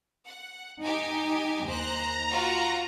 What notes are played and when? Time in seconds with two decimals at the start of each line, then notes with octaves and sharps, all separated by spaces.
0.25 F#5
0.82 D#4 G4 G#5
1.66 D#2 C5 A#5 F#6
2.30 F4 F#4 A5